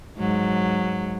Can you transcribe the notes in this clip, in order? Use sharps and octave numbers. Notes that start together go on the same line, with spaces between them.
G#2 F#3